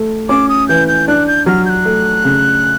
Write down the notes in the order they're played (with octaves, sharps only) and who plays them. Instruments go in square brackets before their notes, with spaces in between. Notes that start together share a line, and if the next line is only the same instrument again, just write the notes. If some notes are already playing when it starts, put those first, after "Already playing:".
Already playing: [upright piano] A3
[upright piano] C#4 [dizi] D6
[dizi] D#6
[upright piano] E3 [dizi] G6
[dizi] G6
[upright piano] D4 [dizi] F#6
[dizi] G6
[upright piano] F#3 [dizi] F6
[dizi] G6
F#6
[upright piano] A3
C#3